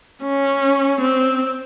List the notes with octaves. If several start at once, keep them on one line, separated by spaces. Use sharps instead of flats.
C#4
C4